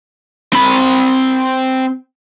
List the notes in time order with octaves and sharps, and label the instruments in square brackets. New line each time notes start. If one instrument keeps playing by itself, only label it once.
[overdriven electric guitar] C4 B5